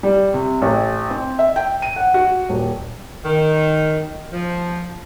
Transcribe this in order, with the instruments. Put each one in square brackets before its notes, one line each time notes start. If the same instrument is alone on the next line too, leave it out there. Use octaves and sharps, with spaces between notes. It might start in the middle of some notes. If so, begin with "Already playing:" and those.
[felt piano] G3
C3
A1
C4
E5
G5
D#7
F#5
F#4
D#1
[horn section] D#3
F3